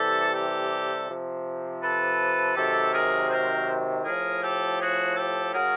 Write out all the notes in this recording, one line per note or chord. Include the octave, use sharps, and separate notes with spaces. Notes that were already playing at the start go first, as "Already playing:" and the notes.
Already playing: C3 E3 G3 G4 A4
G4 A4
C3 F3
A4 B4
C3 D#3 F#3 G4 A4
G#4 A#4
A#4 C5
A2 F3 G#4 A#4
G4 A4
F#4 G#4
G4 A4
C#3 F#3 G#4 A#4